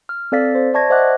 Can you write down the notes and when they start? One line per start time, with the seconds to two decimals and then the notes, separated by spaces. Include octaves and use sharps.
0.09 F6
0.32 C4 A4 D5 F5 A6 B6
0.55 C5
0.74 D5 E5 A5 C#6 G#6 A#6
0.90 C5 D#5 E5 F#5 D6 F#6